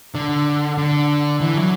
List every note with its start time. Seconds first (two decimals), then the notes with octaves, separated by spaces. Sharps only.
0.15 D3
0.78 D3
1.41 E3
1.57 F#3